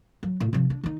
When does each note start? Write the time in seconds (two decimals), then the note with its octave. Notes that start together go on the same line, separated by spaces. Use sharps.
0.23 F#3
0.40 A2
0.53 C3 F3
0.70 D4
0.84 D#3 D#4